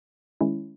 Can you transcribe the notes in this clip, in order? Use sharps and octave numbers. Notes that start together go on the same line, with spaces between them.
D#3 G#3 C#4 E4